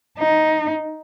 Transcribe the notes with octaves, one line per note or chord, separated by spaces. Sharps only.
D#4